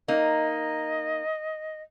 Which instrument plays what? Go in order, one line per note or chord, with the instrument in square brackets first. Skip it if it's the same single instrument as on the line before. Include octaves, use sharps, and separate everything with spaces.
[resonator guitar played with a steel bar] A#3 D#4 [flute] D#5